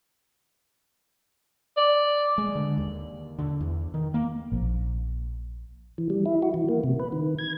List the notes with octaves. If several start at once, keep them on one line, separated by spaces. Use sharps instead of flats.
D5
G#3
D3
D#2
D3
E2
D#3
A#3
A#1
E3
G3
E4
F#4
E3
A#3
C3
B4
D#3
G#6